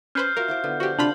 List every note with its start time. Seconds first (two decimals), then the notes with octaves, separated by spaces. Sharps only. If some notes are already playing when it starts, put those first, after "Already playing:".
0.15 C#4 B4 C5 F6 G6 C7
0.37 F4 F#4 A#4 E5
0.48 E4 C5 D6
0.64 D3 B3
0.80 F3 F#4 G4 C6
0.99 C3 D4 F4 B5 F#7